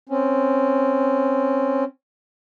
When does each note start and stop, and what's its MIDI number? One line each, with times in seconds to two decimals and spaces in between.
0.09 1.84 60
0.09 1.84 61